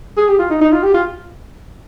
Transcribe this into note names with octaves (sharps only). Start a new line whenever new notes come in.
G#4
G4
F4
D#4
D#4
F4
G4
F4